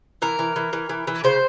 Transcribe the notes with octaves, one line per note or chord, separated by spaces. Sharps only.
E3 A#4
E3
E3
E3
E3
E3
C#3 C5